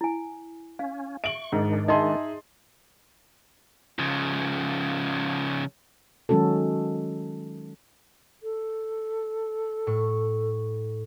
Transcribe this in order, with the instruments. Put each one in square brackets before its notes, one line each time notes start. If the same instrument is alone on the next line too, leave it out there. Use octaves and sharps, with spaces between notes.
[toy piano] E4 G#5
[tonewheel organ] C#4 [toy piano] F5
[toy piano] E5 [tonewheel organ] C#6 [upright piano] D7 F#7
[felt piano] G#2 [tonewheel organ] D#3 G#3 D4
[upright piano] D#4 G#4 E5 [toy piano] D#5 [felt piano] A5 C6
[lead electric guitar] C#3 F3
[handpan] D#3 F#3 G#3 C#4 F#4 A4
[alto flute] A4
[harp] A2 C#6